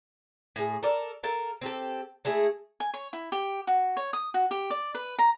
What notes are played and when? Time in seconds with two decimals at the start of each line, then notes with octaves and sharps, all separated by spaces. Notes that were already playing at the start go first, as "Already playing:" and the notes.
0.56 A2 G#4
0.83 A4 A#4 D5
1.23 A4 A#4 F5
1.61 C4 G4 A4
2.25 G#3 A3 E4 G#4
2.80 G#5
2.94 C#5
3.13 E4
3.32 G4
3.67 F#4
3.97 C#5
4.13 D#6
4.34 F#4
4.51 G4
4.70 D5
4.95 B4
5.19 A#5